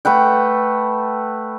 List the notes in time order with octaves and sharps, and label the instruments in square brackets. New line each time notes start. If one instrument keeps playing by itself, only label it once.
[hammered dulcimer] A3 B4 F#5 G5